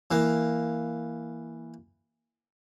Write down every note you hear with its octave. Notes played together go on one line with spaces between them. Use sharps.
E3 A#3